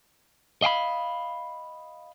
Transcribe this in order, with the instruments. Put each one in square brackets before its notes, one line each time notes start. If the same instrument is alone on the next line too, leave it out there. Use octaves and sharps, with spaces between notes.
[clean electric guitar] D#5 F5 G5 B5